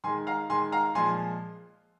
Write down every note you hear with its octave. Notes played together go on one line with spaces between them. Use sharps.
D#3 G#3 G#5 C6
F5 A#5
D#3 G#3 G#5 C6
F5 A#5
A#2 F3 G#3 G#5 C6